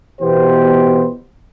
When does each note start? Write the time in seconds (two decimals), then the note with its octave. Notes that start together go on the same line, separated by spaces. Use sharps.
0.20 B2 E3 B3 G4 C5